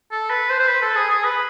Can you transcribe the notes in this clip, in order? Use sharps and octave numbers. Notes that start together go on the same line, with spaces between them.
A4
B4
C5
C5
B4
A4
G#4
G#4
B4